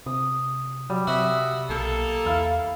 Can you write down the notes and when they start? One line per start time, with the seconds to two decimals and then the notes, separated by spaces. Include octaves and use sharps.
0.06 C3 D#6
0.90 F#3 G3
1.08 C3 F#4 D#5 E5
1.69 B1 A#3 A4
2.26 E2 E4 F5